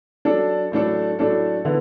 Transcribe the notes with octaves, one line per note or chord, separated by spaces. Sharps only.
F#3 D4 A4
A2 F#3 A3 D4 A4
A2 F#3 A3 D4 A4
D3 B3 E4